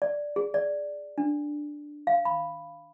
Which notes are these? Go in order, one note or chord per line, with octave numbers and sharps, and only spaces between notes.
D5
G#4
D5
D4
F5
B5